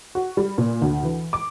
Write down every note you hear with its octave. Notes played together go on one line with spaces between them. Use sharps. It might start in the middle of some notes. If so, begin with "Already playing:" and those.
F#4
G3
A#2
D2
E3
D6